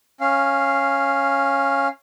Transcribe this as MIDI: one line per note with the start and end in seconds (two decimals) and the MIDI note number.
0.21 1.88 61
0.21 1.88 77